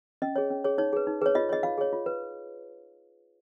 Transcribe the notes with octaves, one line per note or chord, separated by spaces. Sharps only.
C#4 D#5
G#4 C#5
C#4
G#4 C#5
D#4 C#5
G#4 B4
D#4
G#4 B4 C#5
F4 D#5
G#4 C#5 D#5
F4 F5
G#4 C#5
F4
B4